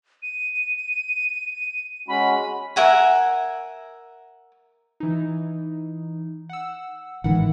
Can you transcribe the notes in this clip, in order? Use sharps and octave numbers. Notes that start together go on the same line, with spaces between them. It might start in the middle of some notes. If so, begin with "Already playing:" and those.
D#7
G#3 C#4 F#4 B5
A#4 E5 F#5 G#5
E3 D#4
F#5 E6
A1 G#2 D#3 E3 A#4 F#5